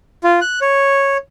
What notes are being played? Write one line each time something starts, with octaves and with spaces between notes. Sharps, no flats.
F4
F#6
C#5